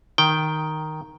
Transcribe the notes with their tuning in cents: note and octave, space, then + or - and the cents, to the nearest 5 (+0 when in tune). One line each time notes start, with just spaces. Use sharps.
D#3 +0 G5 +0